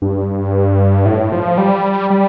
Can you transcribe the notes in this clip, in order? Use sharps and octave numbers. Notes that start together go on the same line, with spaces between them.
G2
A2
F3
G3
G3